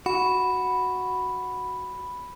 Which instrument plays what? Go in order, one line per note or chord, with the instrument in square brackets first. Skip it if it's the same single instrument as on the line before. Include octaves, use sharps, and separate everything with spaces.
[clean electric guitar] F#4 [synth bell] B5